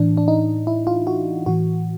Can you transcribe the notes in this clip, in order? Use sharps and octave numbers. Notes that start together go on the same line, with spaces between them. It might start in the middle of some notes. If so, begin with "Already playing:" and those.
Already playing: A2 E3 D4
D4
D#4
E4
F4
F#4
A2 E3 F#4